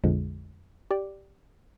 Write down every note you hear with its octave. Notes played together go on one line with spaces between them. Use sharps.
A#1 F2 D3 F3 G#3
G4 D5